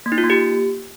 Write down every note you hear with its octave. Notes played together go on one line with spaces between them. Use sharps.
A#3
D#4
F4
A#3
G4